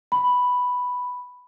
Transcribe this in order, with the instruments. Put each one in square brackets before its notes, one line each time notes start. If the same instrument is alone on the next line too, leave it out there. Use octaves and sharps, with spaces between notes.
[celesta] B5